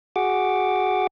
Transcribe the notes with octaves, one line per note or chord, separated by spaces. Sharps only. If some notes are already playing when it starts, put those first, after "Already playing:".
F#4 G#4 F#5 D6